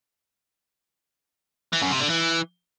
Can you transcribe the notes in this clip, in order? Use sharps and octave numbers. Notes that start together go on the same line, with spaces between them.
E3
F#2
C3
D3
E3